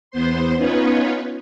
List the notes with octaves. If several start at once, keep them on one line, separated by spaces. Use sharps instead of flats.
E2 B3 C5 C6
B3 C#4 D#4 F4 B4 C#5